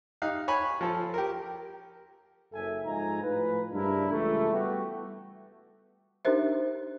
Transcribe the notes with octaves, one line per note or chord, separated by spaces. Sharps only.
D#4 G4 F5 F#6
C#5 G#5 B5
F3 A4
G4 A#4
F#1 F#2 A4 E5 G#5
G#2 F3 D#4 G#5 A#5
A2 F3 B4
G2 C#3 D4 E4 A#4
C#2 E3 A3
G3 A3 B3 F#4 G4
D4 D#4 G4 A#4 C5 E5